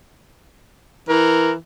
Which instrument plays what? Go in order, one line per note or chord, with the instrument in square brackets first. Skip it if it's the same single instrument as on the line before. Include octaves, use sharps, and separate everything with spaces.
[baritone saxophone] E3 [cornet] A#4